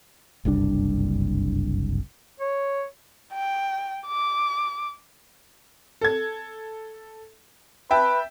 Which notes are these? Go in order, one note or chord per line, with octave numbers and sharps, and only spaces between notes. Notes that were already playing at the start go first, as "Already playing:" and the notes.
F#1 C2 G2 D4
C#5
G5
D6
A4 G#6
B4 E5 G5 A5